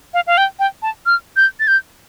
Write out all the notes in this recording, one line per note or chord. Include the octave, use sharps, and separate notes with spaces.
F5
F5
G5
G5
A5
F6
G6
A6
G6